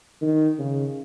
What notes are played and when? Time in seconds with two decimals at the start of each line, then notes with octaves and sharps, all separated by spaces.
0.22 D#3
0.59 C#3